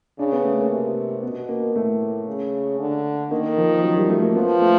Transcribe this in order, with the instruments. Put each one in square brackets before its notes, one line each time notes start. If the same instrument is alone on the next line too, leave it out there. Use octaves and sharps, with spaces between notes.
[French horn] C#3 [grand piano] D4
[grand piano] B3
A3
A#3
[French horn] C3
[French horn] B2 [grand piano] B3
[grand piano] A#3
[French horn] A2 [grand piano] A3
[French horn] C#3
D3
[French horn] D#3 [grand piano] A#3
[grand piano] F3
F#3
G3
A3
A#3
[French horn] F3 [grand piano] B3
[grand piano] A3